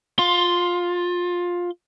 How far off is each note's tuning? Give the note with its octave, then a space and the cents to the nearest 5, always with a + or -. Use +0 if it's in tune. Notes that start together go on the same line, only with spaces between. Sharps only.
F4 +15 C6 +0